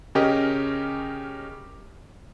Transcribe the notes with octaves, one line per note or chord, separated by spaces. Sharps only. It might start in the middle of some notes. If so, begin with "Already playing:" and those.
C#3 C#4 G4 A#4 D#5